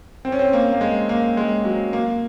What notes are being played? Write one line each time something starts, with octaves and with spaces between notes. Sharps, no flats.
C4
C#4
C4
A#3
A#3
G#3
A#3
G#3
F#3
A#3